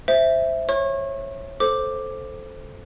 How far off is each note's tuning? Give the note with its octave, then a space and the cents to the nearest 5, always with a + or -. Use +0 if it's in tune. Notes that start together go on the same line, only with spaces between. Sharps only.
C5 +0 E5 +0
C#5 -20 C#6 -35
A4 -10 C5 +0 D6 +5